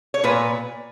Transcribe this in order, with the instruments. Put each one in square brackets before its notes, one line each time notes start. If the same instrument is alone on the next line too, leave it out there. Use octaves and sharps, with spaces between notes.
[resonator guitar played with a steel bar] C#5
A#2 B4